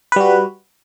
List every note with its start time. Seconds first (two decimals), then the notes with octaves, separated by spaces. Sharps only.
0.12 B4
0.16 G3
0.20 F#4